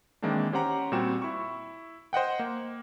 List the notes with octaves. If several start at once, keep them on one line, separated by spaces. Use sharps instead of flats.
D#3 E3 G#3 A#3 C4 D4
C#4 G4 C5 F#5 A#5
A#2 G3 C4 F#4 E7
E4 C#6
C5 D#5 F#5 G5
A#3